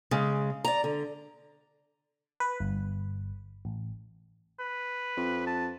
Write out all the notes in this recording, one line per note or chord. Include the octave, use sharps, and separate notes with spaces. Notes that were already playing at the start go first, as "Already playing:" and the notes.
C#3 G#3
D5 A#5
D3
B4
G1
A1
B4
F2
A5